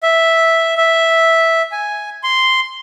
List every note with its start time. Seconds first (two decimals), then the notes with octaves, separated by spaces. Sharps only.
0.03 E5
0.77 E5
1.72 G#5
2.23 C6